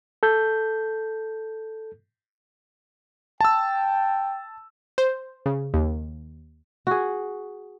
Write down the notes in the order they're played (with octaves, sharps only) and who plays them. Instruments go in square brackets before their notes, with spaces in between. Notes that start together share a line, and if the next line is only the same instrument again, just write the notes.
[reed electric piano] A4 G6
[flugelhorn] G5 [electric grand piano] A5 E6
[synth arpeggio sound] C5
C#3
D#2
[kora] F#4 G#4